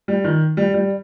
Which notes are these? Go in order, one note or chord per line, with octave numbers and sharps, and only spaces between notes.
G3
D#3
G3
G3